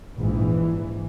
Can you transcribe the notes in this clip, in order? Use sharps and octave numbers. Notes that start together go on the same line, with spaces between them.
A#1 G#2 E3